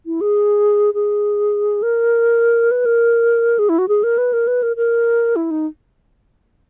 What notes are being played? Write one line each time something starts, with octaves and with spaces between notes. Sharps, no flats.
E4
G#4
G#4
A#4
B4
A#4
G#4
E4
F#4
G#4
A#4
B4
A#4
B4
A#4
A#4
E4
D#4